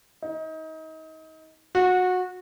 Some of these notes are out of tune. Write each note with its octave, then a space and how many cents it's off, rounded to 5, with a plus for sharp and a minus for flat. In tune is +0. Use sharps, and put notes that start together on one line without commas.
D#4 +30
F#4 -20